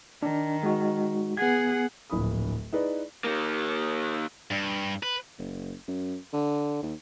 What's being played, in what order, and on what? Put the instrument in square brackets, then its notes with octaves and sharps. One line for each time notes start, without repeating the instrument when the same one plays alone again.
[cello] D#3 [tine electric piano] D4
[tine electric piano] G#3 D#4 F#4
[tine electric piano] B3 G#6 [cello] G#4 F#5
[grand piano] D1 A#1 E4 B5 D#6
D#4 E4 G#4 B4 D5
[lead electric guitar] D#3 A#3
[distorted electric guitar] G2
B4
[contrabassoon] F#1
F#2
D3
D#2